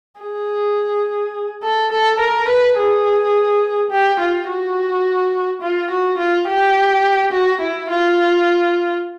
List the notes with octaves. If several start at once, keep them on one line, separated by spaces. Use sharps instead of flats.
G#4
A4
A4
A#4
B4
G#4
G4
F4
F#4
F4
F#4
F4
G4
F#4
E4
F4